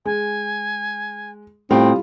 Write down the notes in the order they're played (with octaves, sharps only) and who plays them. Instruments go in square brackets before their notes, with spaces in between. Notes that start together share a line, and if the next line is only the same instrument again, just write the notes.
[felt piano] G#3 [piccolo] G#5
[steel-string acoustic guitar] A2 [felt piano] G3 F4 [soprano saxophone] C4 [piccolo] D#6